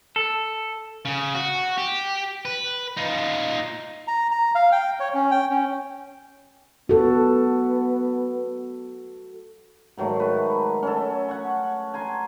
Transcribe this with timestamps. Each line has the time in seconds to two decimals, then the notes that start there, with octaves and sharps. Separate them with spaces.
0.16 A4
1.05 C#3
1.35 F#4
1.78 G4
2.45 B4
2.97 D#4 F4
4.08 A#5
4.31 A#5
4.55 F5
4.72 G5
5.00 C#5
5.14 C#4
5.31 G5
5.51 C#4
6.89 B3 F#4 A4
9.97 G#2 D#3 F#3 A3
10.20 B4
10.83 C#4 A4
11.28 F#5 C#6
11.94 G#5 A#5 C6